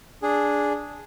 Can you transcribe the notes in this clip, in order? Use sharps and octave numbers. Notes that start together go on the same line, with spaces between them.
D4 G#4